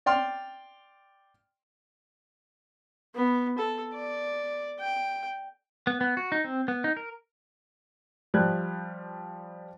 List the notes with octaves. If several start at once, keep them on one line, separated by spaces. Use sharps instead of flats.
D5 G5 C6 F6
B3
A4
D5
G5
B3
B3
F#4
D#4
C4
B3
D#4
A#4
F3 G3 F#6 G#6